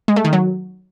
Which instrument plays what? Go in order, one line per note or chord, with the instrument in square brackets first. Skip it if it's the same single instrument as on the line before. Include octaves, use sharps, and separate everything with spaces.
[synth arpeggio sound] G#3
A3
D#3
F#3